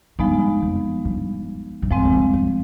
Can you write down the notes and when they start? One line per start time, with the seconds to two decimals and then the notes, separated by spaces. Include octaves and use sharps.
0.19 G2 F3 G#3 B3 D#4
0.62 F2
1.05 G2
1.82 G2
1.91 G#2 F3 G#3 C4
2.05 F2
2.12 G2
2.33 G2